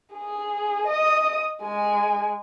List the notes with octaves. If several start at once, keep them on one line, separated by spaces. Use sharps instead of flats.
G#4
D#5 D#6
G#3 G#5